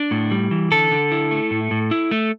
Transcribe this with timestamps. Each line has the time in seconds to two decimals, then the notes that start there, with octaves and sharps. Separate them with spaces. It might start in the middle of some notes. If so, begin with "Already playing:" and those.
Already playing: D4
0.11 A2
0.31 G3
0.51 E3
0.72 D3 A4
0.92 D3
1.12 E4
1.31 A3
1.51 A2
1.71 A2
1.91 E4
2.11 A3